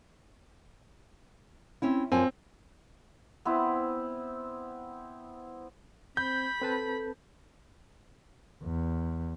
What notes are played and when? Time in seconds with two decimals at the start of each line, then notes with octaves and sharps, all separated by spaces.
1.82 C4 C#4 E4
2.12 F#2 F3 C4 G#5
3.45 B3 C4 E4
6.17 C4 B5 G6
6.62 C4 A4 B4 A5
8.63 E2